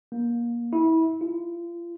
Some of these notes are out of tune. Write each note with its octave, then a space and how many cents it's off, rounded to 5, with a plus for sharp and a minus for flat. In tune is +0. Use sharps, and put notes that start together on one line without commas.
A#3 +25
E4 -25
F4 -35